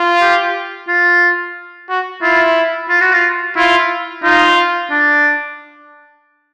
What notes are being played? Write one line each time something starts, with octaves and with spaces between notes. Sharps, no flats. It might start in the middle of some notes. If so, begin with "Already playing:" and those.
Already playing: F4
G4
F4
F#4
E4 F4
F4
F#4
F4
E4 F4
D#4 F4
D4